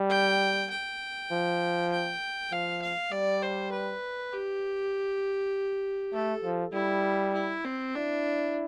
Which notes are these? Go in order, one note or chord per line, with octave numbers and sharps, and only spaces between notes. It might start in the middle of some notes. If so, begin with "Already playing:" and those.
Already playing: G3
G5
G5
F3
G5
F3 F5
F5
G3 D5
C5
B4
G4
A3 A4
F3
G3 E4
E4
C4
D4 E4